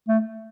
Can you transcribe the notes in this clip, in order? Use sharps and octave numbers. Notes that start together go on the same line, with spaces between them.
A3